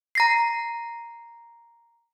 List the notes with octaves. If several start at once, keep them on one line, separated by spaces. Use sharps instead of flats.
A#5 A#6 C7